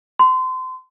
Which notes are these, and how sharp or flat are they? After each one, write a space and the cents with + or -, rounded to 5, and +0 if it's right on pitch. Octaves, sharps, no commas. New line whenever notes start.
C6 -30